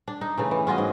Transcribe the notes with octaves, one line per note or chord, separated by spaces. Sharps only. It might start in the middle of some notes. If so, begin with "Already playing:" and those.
D4
D#4
C#3 E3 A3
E3
C#4 F4 F#4 D#5
G#2